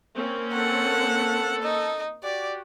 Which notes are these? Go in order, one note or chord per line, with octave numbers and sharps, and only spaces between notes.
A#3 C4 C#4
A4 F#5
D#4
F#4 G4 D5